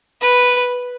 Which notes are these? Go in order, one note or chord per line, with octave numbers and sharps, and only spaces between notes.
B4